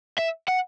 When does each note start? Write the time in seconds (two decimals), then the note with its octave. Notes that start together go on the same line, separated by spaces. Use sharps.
0.19 E5
0.49 F#5